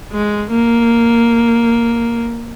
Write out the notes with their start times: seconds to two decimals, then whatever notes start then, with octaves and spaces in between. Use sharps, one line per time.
0.12 G#3
0.51 A#3